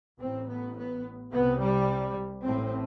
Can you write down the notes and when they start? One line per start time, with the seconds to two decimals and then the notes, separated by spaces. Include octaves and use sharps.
0.18 A1 A2 C4
0.47 B3
0.75 B3
1.31 C2 C3 B3
1.60 G3
2.44 A1 A2 C4